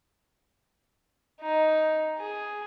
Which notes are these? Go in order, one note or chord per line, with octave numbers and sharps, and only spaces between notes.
D#4
G#4